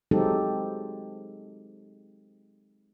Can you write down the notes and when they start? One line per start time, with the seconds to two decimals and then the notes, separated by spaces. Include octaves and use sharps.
0.11 F#3 G#3 C4 D#4 G4 A4